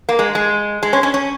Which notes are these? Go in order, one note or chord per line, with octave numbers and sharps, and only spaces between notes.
A#3
G#3
G#3
G#3
C#4
C#4
C#4